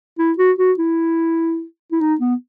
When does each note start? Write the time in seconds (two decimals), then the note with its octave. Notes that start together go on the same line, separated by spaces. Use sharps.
0.19 E4
0.38 F#4
0.59 F#4
0.79 E4
1.92 E4
2.01 D#4
2.21 B3